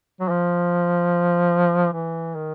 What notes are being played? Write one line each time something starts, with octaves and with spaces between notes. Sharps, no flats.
F#3
F3
E3
D#3